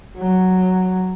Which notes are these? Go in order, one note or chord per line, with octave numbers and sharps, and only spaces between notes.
F#3